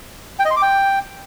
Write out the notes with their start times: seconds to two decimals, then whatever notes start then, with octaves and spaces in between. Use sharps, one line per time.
0.39 G5
0.45 D#5
0.51 C6
0.56 D6
0.62 G5